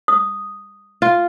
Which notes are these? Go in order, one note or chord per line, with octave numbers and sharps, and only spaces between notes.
D#6
F4